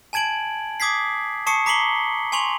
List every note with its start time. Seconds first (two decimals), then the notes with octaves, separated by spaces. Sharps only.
0.13 G#5 A5 G#6 D7 F#7
0.80 D6 D#6 G#6 B6 C7
1.47 A5 C#6 D#6 C7 C#7
1.66 A#5 D6 B6 C7 F#7 G7
2.32 G#5 C6 C#6 F7 F#7